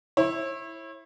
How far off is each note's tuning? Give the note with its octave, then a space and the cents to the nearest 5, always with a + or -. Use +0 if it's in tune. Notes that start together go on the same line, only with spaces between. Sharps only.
E4 +0 C#5 -40